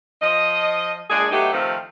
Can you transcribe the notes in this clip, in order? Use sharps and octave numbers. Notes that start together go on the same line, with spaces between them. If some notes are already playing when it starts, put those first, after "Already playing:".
F3 D#5
A#2 G#3 D4 G#4
F#3 A3 B3 D#4 G4
C3 D#3 F3 A3 C4